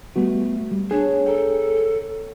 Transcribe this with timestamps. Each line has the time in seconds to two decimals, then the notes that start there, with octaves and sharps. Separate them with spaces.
0.16 G3 A3 B3 F#4
0.71 G3
0.91 B3 D4 G#4 C#5 F#6
1.26 A4 G5 A#5